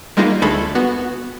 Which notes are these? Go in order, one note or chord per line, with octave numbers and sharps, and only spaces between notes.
G3 G#3 A#3 D#4 F4
D2 G#3 A3 A4 B5 A6
B3 F#4